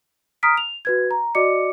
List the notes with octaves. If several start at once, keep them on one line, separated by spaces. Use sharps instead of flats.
A#5 D#6 F6 B6 D7
F7
F#4 B4 G#6
A#5
F#4 D5 D#5 D6 C#7